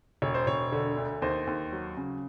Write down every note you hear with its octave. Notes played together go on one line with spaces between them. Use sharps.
E1 C#5
C5
E1 C#5
D3
D2
D#2 C5
D#2
F#3
C#3